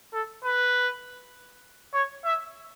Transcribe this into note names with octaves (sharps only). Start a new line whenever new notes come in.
A4
B4
C#5
E5